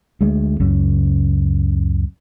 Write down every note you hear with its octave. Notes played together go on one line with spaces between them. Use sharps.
D2 G#3 A3
C#2 F#2 C#3